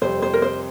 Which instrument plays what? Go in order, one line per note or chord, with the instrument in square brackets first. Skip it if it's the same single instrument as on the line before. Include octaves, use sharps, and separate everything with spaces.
[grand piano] F2 C3 G3 [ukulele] C5
[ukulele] C5
A#4
C5